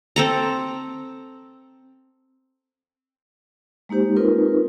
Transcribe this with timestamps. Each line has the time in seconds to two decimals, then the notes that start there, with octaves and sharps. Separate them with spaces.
0.16 C4 A4 A#5
3.89 G#3 A#3 D#4 G4 C5
4.16 C4 D#4 F4 A#4 B4